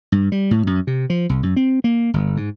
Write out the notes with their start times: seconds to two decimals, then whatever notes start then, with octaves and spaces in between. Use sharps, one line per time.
0.12 G2
0.32 G3
0.51 A2
0.67 F#2
0.87 C3
1.10 F3
1.29 C2
1.43 F#2
1.56 C4
1.84 A#3
2.14 G1
2.37 G#2